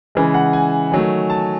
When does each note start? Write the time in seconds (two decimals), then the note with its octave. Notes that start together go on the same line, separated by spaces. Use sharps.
0.15 C#3 E3 G#3
0.34 F#5
0.53 G#5
0.92 D#3 F#3 A3
1.30 A5